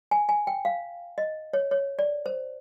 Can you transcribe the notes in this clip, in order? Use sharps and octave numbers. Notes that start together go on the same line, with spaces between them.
G#5
G#5
G5
F5
D#5
C#5
C#5
D5
C5